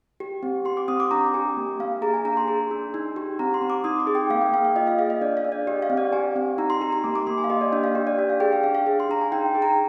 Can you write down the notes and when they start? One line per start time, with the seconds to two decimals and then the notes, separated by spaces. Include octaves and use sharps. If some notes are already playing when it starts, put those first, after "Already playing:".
0.20 G4
0.43 C4
0.65 G4 C6
0.77 D6
0.88 C4 D#6
1.00 D6
1.11 D4 A#5
1.34 G4 G#5
1.57 A#3
1.80 A#3 F5
2.02 G#4 A#5
2.14 G#5
2.25 D4 A#5
2.37 C6
2.48 G#4
2.71 D4
2.94 D#4
3.16 G4
3.39 C4 A#5
3.54 C6
3.62 C4
3.70 D6
3.84 D#4 D#6
4.00 D6
4.07 G#4
4.15 G5
4.30 A#3 F5
4.42 G5
4.53 A#3 F5
4.65 F5
4.76 F4 D#5
4.87 F5
4.99 G#4 F5
5.10 D#5
5.21 D4 D5
5.37 F5
5.44 D4
5.52 D5
5.67 G4 D#5
5.82 F5
5.90 C4
5.97 D5
6.12 G4 G#5
6.36 C4
6.58 D#4 A#5
6.70 C6
6.81 G4 A#5
6.92 C6
7.04 A#3 D6
7.16 D6
7.27 A#3 C6
7.38 G#5
7.44 F5
7.50 G4 D#5
7.61 D5
7.73 D4 D#5
7.84 F5
7.95 G4
8.07 D5
8.19 D4
8.29 F5
8.40 G#4 G5
8.52 F5
8.63 D4 F5
8.75 F5
8.87 G#4
9.00 C6
9.09 D4 A#5
9.21 G#5
9.32 D#4 G5
9.55 G#4
9.62 A#5